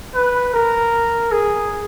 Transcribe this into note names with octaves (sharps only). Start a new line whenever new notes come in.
B4
A#4
G#4